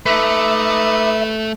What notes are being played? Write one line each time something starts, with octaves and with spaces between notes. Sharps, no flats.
A3 D#4 B4 E5 D6 E6